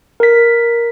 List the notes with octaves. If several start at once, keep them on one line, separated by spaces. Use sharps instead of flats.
A#4 B6